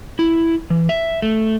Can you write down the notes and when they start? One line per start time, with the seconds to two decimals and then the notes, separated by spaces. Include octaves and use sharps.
0.19 E4
0.70 E3
0.89 E5
1.22 A3